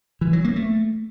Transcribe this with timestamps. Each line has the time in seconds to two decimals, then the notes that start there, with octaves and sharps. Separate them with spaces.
0.21 E3
0.33 F#3
0.44 A#3
0.56 A3